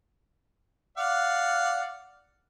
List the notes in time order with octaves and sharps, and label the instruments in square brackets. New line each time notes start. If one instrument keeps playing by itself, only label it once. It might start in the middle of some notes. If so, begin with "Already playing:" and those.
[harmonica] D5 F5 F#5